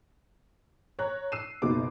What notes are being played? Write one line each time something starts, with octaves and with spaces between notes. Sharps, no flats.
C#5 A#5 F#6
E6 C7 D#7 E7
F#1 B2 A#3 D#4 D6